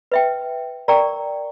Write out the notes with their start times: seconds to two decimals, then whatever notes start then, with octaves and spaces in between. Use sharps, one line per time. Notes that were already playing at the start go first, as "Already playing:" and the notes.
0.12 B4 E5 G5
0.88 A#4 D5 G5 A#5 C#6